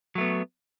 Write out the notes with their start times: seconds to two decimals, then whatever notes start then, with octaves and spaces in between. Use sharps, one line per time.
0.15 F#3
0.18 A3
0.21 B3